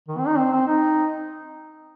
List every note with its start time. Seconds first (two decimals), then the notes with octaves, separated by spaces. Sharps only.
0.08 D#3
0.18 C4
0.27 D#4
0.37 C4
0.52 C4
0.67 D#4